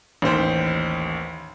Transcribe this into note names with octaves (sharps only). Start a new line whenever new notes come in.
A1 D#2 C5 G5